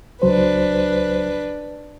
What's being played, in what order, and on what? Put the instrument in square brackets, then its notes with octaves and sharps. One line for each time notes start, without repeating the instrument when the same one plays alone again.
[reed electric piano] C#2 F#3 C5 [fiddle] D4 B4